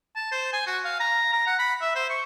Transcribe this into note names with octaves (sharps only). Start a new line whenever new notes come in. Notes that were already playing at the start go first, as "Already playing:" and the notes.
A5
C5
G#5
F#4
F5
A#5
A#5
F#5
B5
E5
C5
C#6